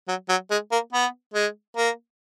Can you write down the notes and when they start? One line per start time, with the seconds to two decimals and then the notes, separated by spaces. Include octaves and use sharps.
0.08 F#3
0.29 F#3
0.51 G#3
0.72 A#3
0.93 B3
1.34 G#3
1.76 A#3